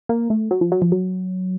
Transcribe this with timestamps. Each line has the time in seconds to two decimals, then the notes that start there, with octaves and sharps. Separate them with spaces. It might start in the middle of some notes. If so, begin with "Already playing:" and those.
0.09 A#3
0.30 A3
0.51 F#3
0.61 F3
0.72 F#3
0.82 F3
0.92 F#3